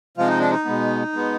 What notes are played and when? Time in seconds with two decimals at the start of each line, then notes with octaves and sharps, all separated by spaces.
0.17 C3 F3 G#3 F4
0.28 D#4
0.40 D4
0.50 D#4
0.65 B2 G#3 B3
1.13 B2 G#3 B3